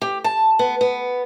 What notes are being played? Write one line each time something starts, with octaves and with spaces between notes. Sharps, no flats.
G4
A5
B3
B3